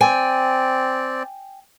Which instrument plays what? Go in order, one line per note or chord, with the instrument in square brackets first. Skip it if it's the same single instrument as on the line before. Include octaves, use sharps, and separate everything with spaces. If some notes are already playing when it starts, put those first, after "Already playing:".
[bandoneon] C4 D5 [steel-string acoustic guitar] G5 G#5